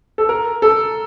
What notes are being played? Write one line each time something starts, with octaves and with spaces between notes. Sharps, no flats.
A4
A#4
A4